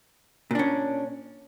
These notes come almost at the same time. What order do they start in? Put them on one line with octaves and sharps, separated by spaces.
A#2 D4 C#4